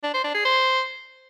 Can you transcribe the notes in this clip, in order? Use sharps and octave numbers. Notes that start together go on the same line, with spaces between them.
D4
C5
D4
G#4
C5